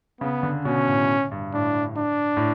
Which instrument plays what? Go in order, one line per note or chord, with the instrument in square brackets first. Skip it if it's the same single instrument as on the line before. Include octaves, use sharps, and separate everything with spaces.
[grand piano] C#3 [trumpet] B3
[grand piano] D3
[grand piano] B2 [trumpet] C#4
[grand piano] A2
G2
[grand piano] A2 [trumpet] D4
[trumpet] D4
[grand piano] A2